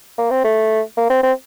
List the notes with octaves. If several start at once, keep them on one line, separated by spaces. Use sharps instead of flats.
A#3
C4
A3
A#3
C4
C4